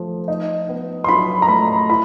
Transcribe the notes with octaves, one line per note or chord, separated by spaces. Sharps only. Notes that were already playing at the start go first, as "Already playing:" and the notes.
Already playing: F3 A3
D#4
B3
C6
F#3 B5
A#5
A2 B5
E4 B5